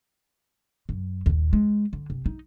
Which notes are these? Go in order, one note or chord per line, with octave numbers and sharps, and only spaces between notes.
F#2
D#1 D#2
G#3
D3
C3
D#4